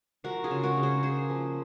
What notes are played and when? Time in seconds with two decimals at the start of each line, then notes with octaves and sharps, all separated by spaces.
0.24 F3 F#4 A#4
0.44 F4 G#4
0.51 C#3
0.63 F#4 A#4
0.78 C#3
0.83 G#4 C5
1.03 A#3 G#4 C5
1.30 F3